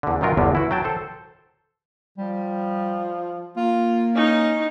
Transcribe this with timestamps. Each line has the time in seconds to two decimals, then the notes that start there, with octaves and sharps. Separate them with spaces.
0.03 E2 D3
0.21 F#2 D#3 F#3 F4 A#4
0.37 G1 E2 D3
0.55 E4 F#4
0.71 F#3 G5 A5
0.84 A4 C5
2.18 F3 G3
3.56 A#3 F4
4.16 C#4 D#4